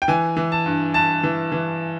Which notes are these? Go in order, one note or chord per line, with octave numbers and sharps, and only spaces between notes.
G5
E3 G#5
E3
A5
G2
G2 A5
E3
E3